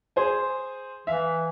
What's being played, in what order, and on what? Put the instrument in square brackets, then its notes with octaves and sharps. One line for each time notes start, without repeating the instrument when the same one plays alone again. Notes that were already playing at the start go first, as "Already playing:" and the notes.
[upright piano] G#4 C5 G#5
[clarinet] E3 [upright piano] E5 F5